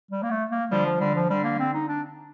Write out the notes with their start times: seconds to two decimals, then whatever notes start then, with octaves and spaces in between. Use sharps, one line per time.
0.11 G3
0.23 A#3
0.31 A3
0.51 A#3
0.71 D3 F3 G3
0.86 F3
1.00 D3 G3
1.15 F3
1.30 D3 G3
1.44 A#3
1.60 C4
1.74 D#4
1.88 D4